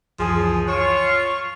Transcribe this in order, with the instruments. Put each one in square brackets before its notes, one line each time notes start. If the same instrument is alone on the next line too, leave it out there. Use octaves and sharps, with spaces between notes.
[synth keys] C#2 F#2 E3 [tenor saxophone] F3 [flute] G#4
[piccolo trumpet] F4 [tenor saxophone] C#5 [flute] C#6 [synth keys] D7 E7